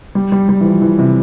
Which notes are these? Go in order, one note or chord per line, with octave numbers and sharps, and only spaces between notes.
G3
G3
G3
E3
F3
E3
C3